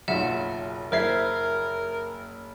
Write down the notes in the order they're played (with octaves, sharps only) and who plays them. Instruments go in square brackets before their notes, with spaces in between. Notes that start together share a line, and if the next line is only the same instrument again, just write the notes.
[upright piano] F#1 B1 F4 [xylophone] E5 F#5 E7
[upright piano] F#1 E4 G#6 [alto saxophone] A#4 [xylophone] C5 E5 C7